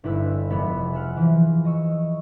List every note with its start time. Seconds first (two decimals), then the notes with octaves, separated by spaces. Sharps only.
0.04 G1 D#4 E4 B4 E5 E6
0.50 F1 G#3 B3 E5 B5
0.93 E5 F#5 F6
1.17 E3 F3
1.65 D#5 C#6 E6